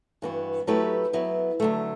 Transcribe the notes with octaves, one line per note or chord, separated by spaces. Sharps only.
G2 E3 B3 F#4
F#3 A3 E4 G4 B4
F#3 B3 E4
D3 F#3 A3